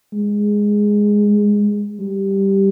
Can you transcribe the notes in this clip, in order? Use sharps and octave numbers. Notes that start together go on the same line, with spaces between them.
G#3
G3